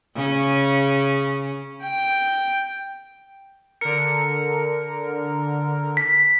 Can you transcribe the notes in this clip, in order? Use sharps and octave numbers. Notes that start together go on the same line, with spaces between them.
C#3 C#4
G5
D3 A#4 C#7
B6